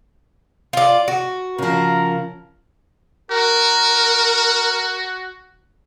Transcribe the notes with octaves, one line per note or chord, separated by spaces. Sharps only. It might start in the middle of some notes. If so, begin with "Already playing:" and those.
F4 D5
F#4
C#3 F3 A#4
F#4 A#4